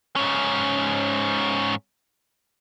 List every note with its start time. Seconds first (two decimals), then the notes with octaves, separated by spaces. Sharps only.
0.16 G#2 C#4